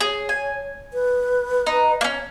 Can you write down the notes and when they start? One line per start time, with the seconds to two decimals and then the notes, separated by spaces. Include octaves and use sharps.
0.01 G#4 C#5
0.29 G#5
0.94 B4
1.66 D#4
2.01 A#3 C#4